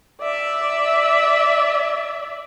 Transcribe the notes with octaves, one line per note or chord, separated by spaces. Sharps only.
D5 E5